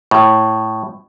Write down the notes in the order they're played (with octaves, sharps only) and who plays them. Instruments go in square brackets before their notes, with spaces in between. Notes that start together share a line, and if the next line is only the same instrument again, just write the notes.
[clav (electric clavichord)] A2